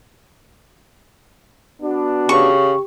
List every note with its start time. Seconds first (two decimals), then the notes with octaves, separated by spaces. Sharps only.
1.82 B3 D4 F#4
2.29 C#3 G4 C#6